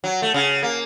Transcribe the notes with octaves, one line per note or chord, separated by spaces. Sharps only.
F#3
A3
C#3
A#3